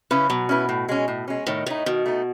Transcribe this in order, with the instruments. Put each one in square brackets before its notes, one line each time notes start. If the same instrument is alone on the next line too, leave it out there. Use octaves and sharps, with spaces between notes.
[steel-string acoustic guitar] C#3 [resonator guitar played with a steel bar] C#4 E4 B4
[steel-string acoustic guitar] B2 [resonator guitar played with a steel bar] F#3
[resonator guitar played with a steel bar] C#4 E4 B4
A2
G#3 C#4
A2
G#3 C#4
[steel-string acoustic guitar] A2 [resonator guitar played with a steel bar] D#3
[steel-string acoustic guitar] A2 [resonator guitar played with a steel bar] A3 D#4
[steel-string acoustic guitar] B2 [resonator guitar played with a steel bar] D#3
[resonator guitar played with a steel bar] A3 D#4